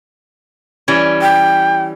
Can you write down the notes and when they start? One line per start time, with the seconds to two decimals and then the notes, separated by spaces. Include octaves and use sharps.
0.88 E3 G3 C#4
1.21 G5